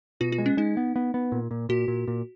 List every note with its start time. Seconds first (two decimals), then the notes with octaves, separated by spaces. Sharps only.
0.21 B2 F4
0.32 F4
0.38 G#3
0.46 C#4
0.57 G#3 D#4
0.77 B3
0.96 B3
1.14 B3
1.32 A#2
1.51 A#2
1.69 A#2 F#4
1.88 A#2
2.08 A#2